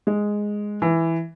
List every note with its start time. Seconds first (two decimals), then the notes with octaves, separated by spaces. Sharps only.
0.07 G#3
0.82 E3